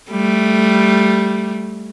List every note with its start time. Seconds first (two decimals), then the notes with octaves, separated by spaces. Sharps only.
0.11 G3 A3